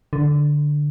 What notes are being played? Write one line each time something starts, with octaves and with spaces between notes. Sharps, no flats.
D3